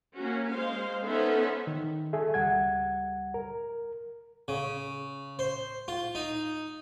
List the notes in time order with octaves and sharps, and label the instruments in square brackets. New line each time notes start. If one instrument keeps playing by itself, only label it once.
[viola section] A#3 C#4 F#4
G#3 C5 F5
B3 C#4 D#4 A4 C5 E5
[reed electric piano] D#3
G#4 A4 E5
C#2 G3 F#5 G#6
A#4
[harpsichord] C#3
C5
F4
D#4